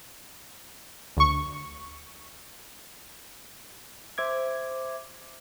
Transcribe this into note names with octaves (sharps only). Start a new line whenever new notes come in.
D2 C#6
C5 E5 D6 G#6